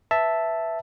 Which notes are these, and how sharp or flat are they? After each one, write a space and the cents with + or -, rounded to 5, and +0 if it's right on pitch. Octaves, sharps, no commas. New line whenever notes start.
B4 +0 E5 +0 A5 +0